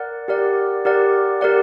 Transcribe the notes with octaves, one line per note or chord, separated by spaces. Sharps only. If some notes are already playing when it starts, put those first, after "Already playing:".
Already playing: A#4 D5 F#5
G4 A#4 D5 F#5
G4 A#4 D5 F#5
G4 A#4 D5 F#5